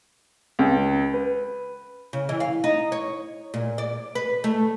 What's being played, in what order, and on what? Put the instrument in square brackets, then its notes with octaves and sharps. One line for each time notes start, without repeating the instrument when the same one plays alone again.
[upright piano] C#2
B4
[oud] C#3
E3
F5
D#4
C#5
A#2
D5
B4
A3